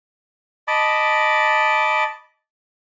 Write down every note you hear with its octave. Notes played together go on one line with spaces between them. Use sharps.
D#5 A5 B5 D6